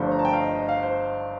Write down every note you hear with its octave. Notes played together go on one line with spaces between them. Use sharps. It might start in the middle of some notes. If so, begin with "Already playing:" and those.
Already playing: G1 G2 F3 A3 C5
A#5
A5
G5
F5
D#5
D#5
F5
C5